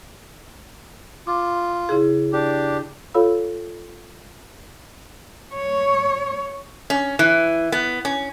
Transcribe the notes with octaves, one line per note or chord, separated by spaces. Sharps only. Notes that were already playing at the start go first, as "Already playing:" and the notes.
F4 D6
C#3 E4 G#4
D4 G4
F4 A4 C#5 F5 B5 E6
C#5
C#4
E3
B3
C#4